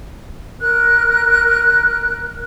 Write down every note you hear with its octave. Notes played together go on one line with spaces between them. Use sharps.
A#4 F#6